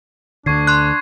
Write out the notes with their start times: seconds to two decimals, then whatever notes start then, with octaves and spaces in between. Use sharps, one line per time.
0.46 D2 D3 D4 C#6 G#6 C7
0.67 C6 F#6